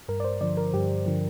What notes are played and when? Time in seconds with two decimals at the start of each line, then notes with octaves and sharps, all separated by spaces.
0.09 G2 A#4
0.20 D5
0.24 C5
0.41 D3 F3 D5
0.57 A#4
0.74 G2 G4
1.06 D3 F3